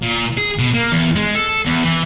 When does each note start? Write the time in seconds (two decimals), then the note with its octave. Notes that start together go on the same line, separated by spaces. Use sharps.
0.02 A#2
0.37 G#4
0.59 B2
0.74 A#3
0.92 E2
1.16 G#3
1.35 A4
1.66 E2
1.84 E3